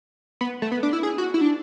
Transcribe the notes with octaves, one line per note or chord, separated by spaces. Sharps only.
B3
A3
B3
D4
E4
G#4
F#4
E4
D4